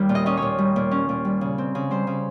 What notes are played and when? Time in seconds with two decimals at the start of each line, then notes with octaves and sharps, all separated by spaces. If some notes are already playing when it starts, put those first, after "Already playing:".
Already playing: D#2 G3
0.09 A#2
0.15 D#5
0.26 C#4 D#5
0.37 A#2 C#5
0.58 G3
0.76 A#2
0.91 C#4
1.09 A#2
1.25 G3
1.41 C#3
1.58 C4
1.75 C#3
1.91 G3 C5
2.07 C#3